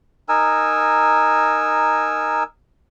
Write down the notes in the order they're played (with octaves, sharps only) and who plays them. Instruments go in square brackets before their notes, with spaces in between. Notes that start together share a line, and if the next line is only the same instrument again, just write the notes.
[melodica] D#4 A#4 G#5 E6